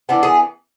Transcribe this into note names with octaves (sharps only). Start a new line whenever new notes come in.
E3 B3 D4
G#4